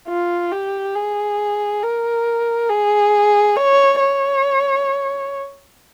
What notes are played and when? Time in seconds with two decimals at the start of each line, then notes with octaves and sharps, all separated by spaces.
0.08 F4
0.52 G4
0.96 G#4
1.83 A#4
2.70 G#4
3.56 C#5
4.00 C#5